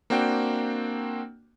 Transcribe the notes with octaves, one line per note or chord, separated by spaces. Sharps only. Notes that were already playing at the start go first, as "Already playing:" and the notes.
A#3 C4 D4 F#4 G5